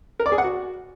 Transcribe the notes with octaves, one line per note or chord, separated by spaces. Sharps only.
A#4
D5
G#4
F#5
F#4